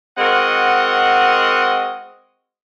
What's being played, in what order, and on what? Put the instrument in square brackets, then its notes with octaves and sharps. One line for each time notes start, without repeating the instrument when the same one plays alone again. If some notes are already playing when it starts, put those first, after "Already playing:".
[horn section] G#3 C4 F#4 A#4 D#5 F#5